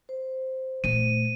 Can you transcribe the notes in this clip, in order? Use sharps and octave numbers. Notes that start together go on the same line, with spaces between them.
C5
A#2 A3 D#7